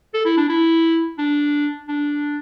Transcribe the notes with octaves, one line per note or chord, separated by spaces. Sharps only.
A4
E4
D4
E4
D4
D4